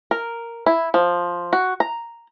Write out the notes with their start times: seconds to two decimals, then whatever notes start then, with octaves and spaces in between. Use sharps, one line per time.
0.11 A#4
0.66 E4
0.94 F3
1.53 F#4
1.80 A#5